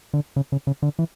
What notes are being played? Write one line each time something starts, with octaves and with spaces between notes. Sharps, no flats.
D3
C#3
C#3
C#3
D3
E3